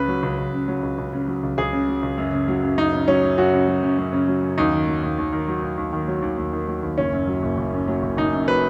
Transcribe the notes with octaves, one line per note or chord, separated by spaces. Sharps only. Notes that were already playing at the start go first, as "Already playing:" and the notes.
Already playing: C#2 C#3 B4
F#3
C#2
C#2
C#3
F#3
C#2
C#2
C#3
F#3
C#2
C#2 G#4
C#3
F#3
C#2
F#2
C#3
F#3
F#2
F#2 D#4
C#3
F#3 C#4
F#2
F#2 F#4
C#3
F#3
F#2
F#2
C#3
F#3
F#2
D#2 D#4
D#3
F#3
D#2
D#2
D#3
F#3
D#2
D#2
D#3
F#3
D#2
D#2
D#3
F#3
D#2
F#1 C#4
F#2
F#3
F#1
F#1
F#2
F#3
F#1
F#1 D#4
F#2
F#3 B4